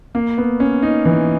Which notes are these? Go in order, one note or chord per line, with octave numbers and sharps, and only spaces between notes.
A#3
B3
C#4
D#4
E3